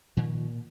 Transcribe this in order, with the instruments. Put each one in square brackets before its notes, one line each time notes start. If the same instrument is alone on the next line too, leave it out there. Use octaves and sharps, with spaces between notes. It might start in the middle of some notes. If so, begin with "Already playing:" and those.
[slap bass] A#2 D#3 F3